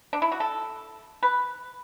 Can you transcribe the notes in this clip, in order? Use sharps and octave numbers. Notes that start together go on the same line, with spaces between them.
D4
E4
F#4
A4
B4